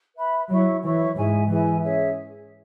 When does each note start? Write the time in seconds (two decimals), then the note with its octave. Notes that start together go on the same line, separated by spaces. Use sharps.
0.16 B4 E5 B5
0.49 F#3 E4 C#5 E5 C#6
0.83 E3 E4 C#5 E5 C#6
1.16 G#2 E4 G#4 E5 G#5
1.49 E3 E4 G#4 E5 G#5
1.82 C#4 G#4 C#5 E5